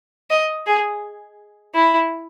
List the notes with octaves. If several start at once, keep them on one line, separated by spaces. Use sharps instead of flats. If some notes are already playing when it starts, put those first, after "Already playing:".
D#5
G#4
E4